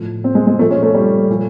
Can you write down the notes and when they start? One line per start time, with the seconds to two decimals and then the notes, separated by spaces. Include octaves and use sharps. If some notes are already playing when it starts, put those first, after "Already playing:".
Already playing: A2 F3
0.24 C4
0.35 G#3
0.47 G#3
0.59 A#2 F3 A3
0.71 C#4
0.83 A3
0.94 G3
1.30 A#2 F3